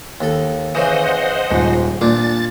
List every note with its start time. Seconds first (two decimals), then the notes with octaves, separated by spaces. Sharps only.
0.21 D#2 A4
0.75 C#3 E3 C5 D#5 F#5
1.51 D#1 G#2
2.01 A#2 D4 A6